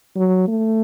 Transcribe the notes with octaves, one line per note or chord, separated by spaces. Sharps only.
F#3
A3